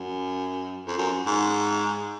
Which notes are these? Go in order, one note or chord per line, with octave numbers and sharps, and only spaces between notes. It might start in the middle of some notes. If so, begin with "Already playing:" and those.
Already playing: F#2
F2
F#2
G#2